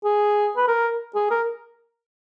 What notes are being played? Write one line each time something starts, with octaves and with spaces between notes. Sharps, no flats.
G#4
B4
A#4
G#4
A#4